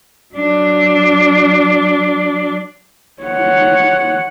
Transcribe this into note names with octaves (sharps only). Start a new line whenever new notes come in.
F#3 D4
C#5 F#5